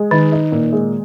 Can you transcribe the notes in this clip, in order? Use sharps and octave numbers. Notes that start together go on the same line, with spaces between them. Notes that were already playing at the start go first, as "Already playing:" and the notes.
Already playing: G#3
D#3 D#4
D#4
A#2
G#3